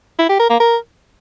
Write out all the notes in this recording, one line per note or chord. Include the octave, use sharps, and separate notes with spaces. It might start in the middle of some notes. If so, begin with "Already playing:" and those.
E4
G4
A#4
A#3
A#4